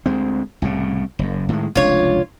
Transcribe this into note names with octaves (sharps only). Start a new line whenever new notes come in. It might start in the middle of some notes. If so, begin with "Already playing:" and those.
D2 G#3 C4
C2 A2 C#3
F#1 F#2
A2 D#3 G#3
F1 C#2 D4 F4 C#5